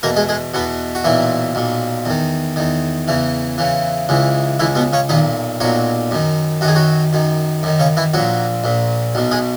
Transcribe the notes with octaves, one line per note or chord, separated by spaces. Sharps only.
E2 B2 A#3 A#4
G#3 G#4
G#3 G#4
E2 B2 B3
F#4
B1 A#2 E3 E4
B1 A#2
E2 D#3
E2 D#3
E2 C#3 E3
E2 C#3 E3
C#2 C#3 E3
C#2 C#3 E3 E4
B2 B3
C#3 C#4
B1 A#2 D#3 D#4
B1 A#2 F#3 F#4
F#2 D#3
F#2 D#3 F#4 G#4
F#3 F#4
F#2 D#3
F#2 D#3
C#3 C#4
E3 E4
A#1 A#2 F#3 F#4
A#1 A#2
B1 B2
G#3 G#4